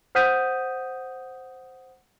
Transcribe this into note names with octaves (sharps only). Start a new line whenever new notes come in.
C5 F#5 D#6 G6 B6 D#7